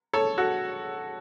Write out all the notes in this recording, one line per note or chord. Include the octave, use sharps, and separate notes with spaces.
A4 C#5
F#4 A4